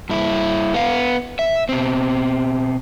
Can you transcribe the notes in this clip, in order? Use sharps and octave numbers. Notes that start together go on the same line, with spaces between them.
G2 E4
B3 F5
E5
B2 C4